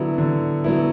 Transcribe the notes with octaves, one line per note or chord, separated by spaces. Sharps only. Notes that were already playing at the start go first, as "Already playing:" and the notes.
Already playing: D3 F#3 B3 E4
D3
F#3 B3 E4